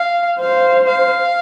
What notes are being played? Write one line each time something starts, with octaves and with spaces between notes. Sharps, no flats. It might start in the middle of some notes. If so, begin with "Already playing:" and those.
Already playing: F5
C5 F5
F5